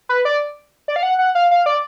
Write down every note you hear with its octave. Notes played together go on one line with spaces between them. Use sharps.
B4
D5
D5
F5
F#5
F#5
F5
F5
D5